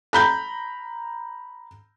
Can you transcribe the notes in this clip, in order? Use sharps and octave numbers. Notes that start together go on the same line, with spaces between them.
A#5 B5 G6